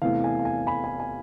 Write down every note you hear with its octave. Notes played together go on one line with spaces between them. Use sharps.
E2 C3 E3 A3 E4 F5
G#5
F5
G#5
G#5 B5
G#5
G#5